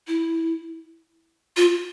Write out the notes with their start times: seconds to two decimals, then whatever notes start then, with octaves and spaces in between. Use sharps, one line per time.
0.07 E4
1.57 F4